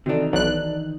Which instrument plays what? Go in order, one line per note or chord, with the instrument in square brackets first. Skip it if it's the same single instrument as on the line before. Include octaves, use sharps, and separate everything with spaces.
[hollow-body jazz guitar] C3 D4 [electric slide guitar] D#3 E3 D#4 [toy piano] F#4 A4
[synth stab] B1 F#6 [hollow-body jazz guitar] D4